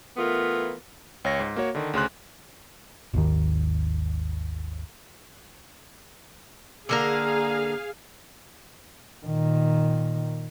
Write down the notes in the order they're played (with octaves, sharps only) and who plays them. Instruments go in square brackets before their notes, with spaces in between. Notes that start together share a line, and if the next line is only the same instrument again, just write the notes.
[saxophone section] E3 A3 B3 F4 A#4
[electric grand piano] C#2 C#5 A#6
G#2
A#3 F#4 C#5
D3 D#3
D2 C#3 C6 F#6
[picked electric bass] G#1 D#2 D#3
[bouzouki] D3 A#3 A#4 [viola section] G#4 F5
[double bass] A#2 D#3